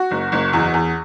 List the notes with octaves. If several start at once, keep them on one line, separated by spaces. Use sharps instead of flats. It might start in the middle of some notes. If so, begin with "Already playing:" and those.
Already playing: F#4
F#1
F#1
E2
E2